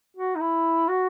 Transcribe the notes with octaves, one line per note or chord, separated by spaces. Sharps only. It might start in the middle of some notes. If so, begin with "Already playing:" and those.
F#4
D#4
E4
F#4